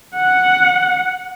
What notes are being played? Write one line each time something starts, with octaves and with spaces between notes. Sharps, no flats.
F#5